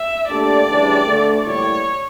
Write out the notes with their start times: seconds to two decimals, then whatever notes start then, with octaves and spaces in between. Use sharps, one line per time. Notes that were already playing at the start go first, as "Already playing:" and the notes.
Already playing: E5
0.28 A#2 A3 D4 G4 D5
0.68 D2 C#3 E3 G3 D4
1.07 D2 D3 A3
1.46 A2 E3 G3 A#3 E4 C#5